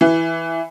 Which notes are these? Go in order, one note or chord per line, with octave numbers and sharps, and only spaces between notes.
E3